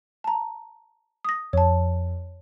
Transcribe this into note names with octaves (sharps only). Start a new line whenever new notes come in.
A5 A#5
D#6 A#6
F2 C#5 A5